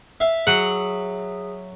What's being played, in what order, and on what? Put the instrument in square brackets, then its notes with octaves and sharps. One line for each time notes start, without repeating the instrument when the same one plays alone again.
[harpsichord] E5 F5
[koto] F#3 F#5 [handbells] G#4